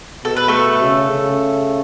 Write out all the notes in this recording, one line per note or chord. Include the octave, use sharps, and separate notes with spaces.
B2 A4
B4
A3 A4
C#3
C#3